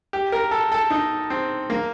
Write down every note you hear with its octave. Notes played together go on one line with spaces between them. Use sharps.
G4
A#4
A4
A4
D#4
C4
A#3